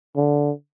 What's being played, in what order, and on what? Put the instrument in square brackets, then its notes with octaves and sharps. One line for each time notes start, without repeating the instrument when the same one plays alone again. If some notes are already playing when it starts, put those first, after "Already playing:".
[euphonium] D3